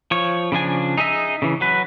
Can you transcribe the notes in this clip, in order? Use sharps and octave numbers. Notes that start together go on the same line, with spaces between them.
F3 C#5
C#3 F3 D4 G#5
D#4 G#4 D#5 E5
C#3 E3
F#3 B4